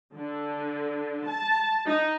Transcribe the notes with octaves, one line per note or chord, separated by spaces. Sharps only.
D3
A5
D#4